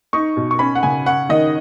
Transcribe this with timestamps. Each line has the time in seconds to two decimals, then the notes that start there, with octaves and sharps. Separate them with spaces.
0.13 D#4 C#6
0.37 B2
0.51 C#6
0.59 C#4 B5
0.75 F#5
0.83 C#3 G#5
1.06 C#4 F#5
1.29 D#3 D#5